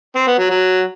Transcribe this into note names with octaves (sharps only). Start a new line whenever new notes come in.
C4
B3
F#3
F#3